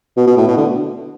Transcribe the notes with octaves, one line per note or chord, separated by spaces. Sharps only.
B2
B2
A2
B2
D3